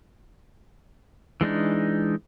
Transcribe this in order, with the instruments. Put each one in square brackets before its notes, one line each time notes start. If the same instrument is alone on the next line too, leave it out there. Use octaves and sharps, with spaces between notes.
[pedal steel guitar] E3 G#3 D4 D#4